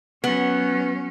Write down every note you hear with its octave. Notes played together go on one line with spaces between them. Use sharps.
F#3 B3 C#4